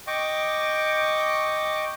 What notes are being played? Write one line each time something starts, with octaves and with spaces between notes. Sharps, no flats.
D#5 G5 C#6 D6